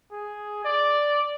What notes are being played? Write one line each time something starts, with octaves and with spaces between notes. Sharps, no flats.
G#4
D5